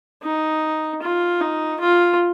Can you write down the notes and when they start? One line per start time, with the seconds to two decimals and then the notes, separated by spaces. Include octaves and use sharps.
0.23 D#4
1.02 F4
1.41 D#4
1.80 F4